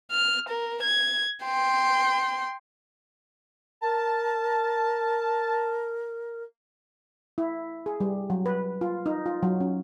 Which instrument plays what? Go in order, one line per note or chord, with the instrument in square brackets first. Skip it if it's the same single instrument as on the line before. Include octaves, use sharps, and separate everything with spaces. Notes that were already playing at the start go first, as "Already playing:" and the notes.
[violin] F6
A#4
G#6
G5 C6
[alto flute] A#4 [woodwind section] A5
[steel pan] E4
G#4
G3
F#3
B4
F4
D#4
F4
F#3
C#4